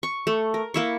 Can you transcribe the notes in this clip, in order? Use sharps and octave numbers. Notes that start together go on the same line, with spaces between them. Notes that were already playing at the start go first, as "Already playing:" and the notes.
C#6
A3
A#4
A#3 E4 C#6